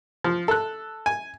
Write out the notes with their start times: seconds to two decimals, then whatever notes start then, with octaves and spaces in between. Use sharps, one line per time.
0.24 F3
0.48 A4 F#6
1.06 G#5